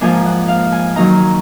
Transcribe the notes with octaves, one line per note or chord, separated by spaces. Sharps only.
G#2 F3 A#3 D4 G#5
F#5
F5
G#5
D#3 F#3 A#3 D#4 A#5